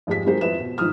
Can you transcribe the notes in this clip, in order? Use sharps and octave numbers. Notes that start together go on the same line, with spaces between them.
G#1 F2 G4 G#4 B6
D#3 F#3 G#3 G4 A#4 C5
F2 E4 B4 E5 E7
B2
G#2 D#3 F3 D#6 F6